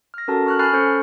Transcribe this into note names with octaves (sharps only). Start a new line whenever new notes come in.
F6 A#6
C#4 F#4 A4 A#4 A5 A#5
C#6 F6 F#6
G#5 B5 F6 F#6 A6 C7
C#4 A4 C5 C#6 G6 C#7